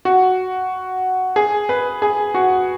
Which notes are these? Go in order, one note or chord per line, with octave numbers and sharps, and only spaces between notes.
F#4
G#4
B4
G#4
F#4